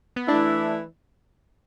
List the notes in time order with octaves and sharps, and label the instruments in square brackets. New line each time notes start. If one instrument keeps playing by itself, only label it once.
[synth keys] B3
[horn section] E3 A3 E4 [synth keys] D4